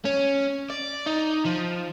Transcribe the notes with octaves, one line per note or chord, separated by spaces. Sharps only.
C#4
D5
D#4
F3